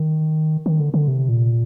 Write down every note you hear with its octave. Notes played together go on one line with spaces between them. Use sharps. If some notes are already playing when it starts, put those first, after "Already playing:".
Already playing: D#3
D#3
D3
D3
C3
A#2